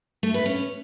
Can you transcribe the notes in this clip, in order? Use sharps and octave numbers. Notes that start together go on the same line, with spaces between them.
A3
B4
C#4